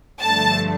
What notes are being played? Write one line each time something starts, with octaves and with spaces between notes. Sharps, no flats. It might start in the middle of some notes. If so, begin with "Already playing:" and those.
G2 D3 F3 A3 A5